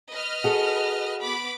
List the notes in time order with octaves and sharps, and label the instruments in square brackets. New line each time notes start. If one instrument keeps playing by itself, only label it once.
[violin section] B4 D#5 F6
[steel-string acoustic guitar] F#4 G#4 A4
[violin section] B3 B5 D6